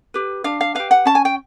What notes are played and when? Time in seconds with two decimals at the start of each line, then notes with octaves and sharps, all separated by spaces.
0.14 G4 B4
0.44 D4 F5
0.61 F5
0.75 G4 B4 F5
0.91 F#5
1.05 C#4 A5
1.15 G#5
1.25 G5